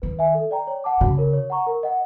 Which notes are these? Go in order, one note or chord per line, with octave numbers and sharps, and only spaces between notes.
D#3 B4
E5 G#5
A4
D5 G5 A#5
C#5
F#5 A5 D6
C#3 F#4
A#4 C#5
C#5
F#5 A#5 C#6
A#4
D#5 F#5